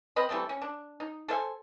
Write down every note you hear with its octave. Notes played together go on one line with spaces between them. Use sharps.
C4 B4 D#5 B5
E3 G3 A3 C4
C#4
D4
D#4
A4 C5 E5 G#5